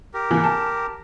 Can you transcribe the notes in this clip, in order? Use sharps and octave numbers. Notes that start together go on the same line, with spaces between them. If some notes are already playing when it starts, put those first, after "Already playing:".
G4 A#4
E3 A#3
A5